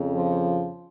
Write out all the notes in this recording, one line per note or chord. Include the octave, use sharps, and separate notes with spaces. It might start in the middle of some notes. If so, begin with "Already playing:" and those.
Already playing: F2 C#3
F3